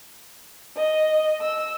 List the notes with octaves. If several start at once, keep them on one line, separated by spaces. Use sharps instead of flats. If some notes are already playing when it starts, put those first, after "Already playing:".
D#5
E6